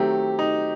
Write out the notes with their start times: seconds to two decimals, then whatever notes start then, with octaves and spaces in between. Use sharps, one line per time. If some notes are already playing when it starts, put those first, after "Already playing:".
Already playing: D#3 F#3 A3 C4 G4
0.39 D#4